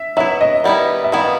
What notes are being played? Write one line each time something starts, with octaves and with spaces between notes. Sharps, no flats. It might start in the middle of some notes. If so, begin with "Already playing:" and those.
Already playing: E5
F#3 B3 E4 E5
D#5
D#3 G3 B3 E4
E5
D#3 G3 B3 E4 F5